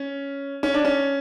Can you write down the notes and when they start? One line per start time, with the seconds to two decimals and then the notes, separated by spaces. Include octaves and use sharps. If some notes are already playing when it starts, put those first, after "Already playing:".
Already playing: C#4
0.63 C#4
0.74 D4
0.85 C#4